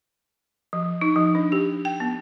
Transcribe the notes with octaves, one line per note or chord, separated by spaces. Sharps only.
F3
D#4
F3
D4
G4
G5
B3